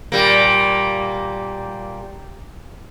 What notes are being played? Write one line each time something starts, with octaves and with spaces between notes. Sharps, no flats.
A#2 G3 A#3